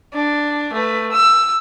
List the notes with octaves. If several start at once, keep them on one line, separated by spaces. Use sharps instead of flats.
D4
A3 B4
E6